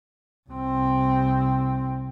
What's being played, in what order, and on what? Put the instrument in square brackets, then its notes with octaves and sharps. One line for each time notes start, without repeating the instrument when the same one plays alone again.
[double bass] C2 C4